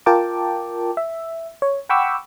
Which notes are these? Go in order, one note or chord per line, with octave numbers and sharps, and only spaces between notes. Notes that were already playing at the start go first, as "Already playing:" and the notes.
F4 A#4 G5 A5 D6
E5
C#5
F#5 G5 B5 C#6 D6 E6